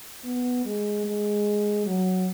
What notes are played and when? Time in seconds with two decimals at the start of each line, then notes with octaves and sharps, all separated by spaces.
0.24 B3
0.65 G#3
1.05 G#3
1.86 F#3